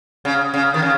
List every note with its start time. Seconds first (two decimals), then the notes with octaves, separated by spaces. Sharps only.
0.25 C#3
0.54 C#3
0.74 D#3
0.82 C#3